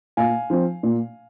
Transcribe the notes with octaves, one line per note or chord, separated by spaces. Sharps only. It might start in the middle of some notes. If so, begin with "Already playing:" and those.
A#2 F5 G#5
F3 C4
A#2